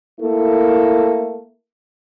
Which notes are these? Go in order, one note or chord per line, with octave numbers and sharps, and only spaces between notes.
A3 A#3 E4 A4